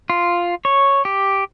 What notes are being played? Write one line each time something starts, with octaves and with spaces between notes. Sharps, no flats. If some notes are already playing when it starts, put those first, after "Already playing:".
F4
C#5
G4